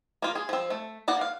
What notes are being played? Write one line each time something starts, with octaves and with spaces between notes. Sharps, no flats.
A#3 F4
G#4
F3 C4
A3
A#3 D5 F#5
F5